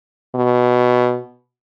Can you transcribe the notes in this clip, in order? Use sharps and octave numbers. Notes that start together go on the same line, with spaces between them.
B2